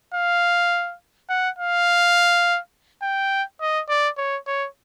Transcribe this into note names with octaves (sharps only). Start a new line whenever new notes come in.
F5
F#5
F5
G5
D#5
D5
C#5
C#5